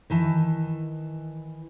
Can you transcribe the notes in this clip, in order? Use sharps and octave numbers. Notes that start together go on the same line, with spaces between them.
D#3 E3 A5